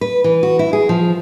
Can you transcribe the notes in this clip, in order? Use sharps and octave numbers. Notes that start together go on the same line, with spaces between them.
B4
E3
F#4
E4
G#4
F3